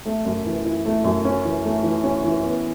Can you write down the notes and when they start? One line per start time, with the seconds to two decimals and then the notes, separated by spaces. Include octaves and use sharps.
0.05 A3
0.25 F#2
0.46 E3
0.65 E4
0.85 A3
1.04 F#2
1.25 C#4
1.44 E3
1.65 A3
1.83 E3
2.04 C#4
2.24 E3
2.43 B3